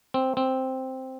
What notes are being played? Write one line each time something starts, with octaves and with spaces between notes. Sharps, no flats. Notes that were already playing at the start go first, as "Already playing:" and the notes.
C4
C4